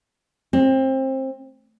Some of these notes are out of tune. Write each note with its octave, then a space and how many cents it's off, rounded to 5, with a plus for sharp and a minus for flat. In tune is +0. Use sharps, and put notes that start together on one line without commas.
C4 +25